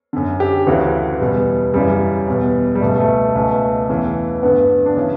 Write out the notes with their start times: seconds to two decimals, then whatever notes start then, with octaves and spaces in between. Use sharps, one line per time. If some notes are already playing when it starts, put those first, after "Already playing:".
0.13 F#2 D3
0.40 G4
0.67 D2 C#3 E3 F#4
1.21 E2 B2 G3
1.74 F#2 C#3 E3 G3
2.28 E2 B2
2.75 G3
2.81 C#2 B2 A3
3.00 A3
3.35 C#2 B2 A3
3.89 E2 C#3 E3
4.43 G2 D3 B3
4.86 D4
4.97 C#3 E3 C#4